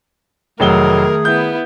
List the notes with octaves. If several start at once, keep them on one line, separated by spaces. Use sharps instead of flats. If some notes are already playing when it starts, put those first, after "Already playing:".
F1 D#3 F#3 A3 G#4 A#4 G7
B3 E4 G6